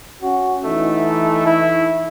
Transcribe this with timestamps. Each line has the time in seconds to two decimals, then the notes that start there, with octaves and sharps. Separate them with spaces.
0.22 C#4 F#4
0.64 E3 A3 D#4
1.46 E4